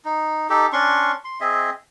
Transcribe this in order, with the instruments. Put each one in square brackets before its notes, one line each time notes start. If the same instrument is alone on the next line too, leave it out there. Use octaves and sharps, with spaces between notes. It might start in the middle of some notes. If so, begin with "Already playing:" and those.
[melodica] D#4
D#4 G4 A4
C#4 D4 C6 C#6
C6
C4 G#4 D#5 E5